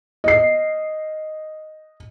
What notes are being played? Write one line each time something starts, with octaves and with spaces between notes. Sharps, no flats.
D#5 C7